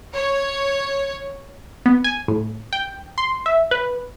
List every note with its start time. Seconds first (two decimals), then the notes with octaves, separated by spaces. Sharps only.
0.14 C#5
1.86 B3
2.04 G#5
2.28 A2
2.73 G5
3.18 C6
3.46 E5
3.71 B4